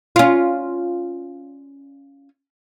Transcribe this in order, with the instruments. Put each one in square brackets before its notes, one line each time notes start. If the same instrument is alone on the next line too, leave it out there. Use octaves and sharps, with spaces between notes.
[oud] C#4 F4